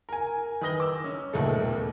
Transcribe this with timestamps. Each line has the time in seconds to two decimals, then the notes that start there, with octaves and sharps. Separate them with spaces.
0.09 A#4 G#5
0.61 D#3 B4 D#6 A#6 G7
0.80 D6 E6
1.04 C#4
1.33 E1 D#2 A#2 D#3 A3 A4